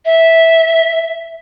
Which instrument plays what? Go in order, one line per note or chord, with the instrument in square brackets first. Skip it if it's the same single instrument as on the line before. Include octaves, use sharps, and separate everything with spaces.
[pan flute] E5